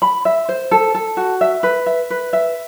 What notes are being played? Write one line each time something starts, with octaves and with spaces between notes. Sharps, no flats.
B5
E5
C5
A4
A4
F#4
E5
B4
E5
B4
E5